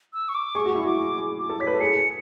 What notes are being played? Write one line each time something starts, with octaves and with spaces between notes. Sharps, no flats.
E6
C#6
D6
G#4 C#6
F#4
E4
F#4 D6
G#4
D6
A4
C#5 B6
B4
A4
G#4 C#7